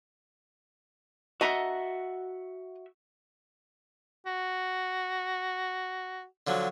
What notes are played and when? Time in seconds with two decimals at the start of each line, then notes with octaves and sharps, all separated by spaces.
1.41 F#4 D#5 E5 F#5 A#5
4.26 F#4
6.47 D3 F3 F#3